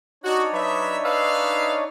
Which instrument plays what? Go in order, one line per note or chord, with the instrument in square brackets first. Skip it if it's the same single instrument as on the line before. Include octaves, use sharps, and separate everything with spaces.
[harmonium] D4 D#4 C#5 [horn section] F#4
[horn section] F#3 B4 E5
B4 E5 F5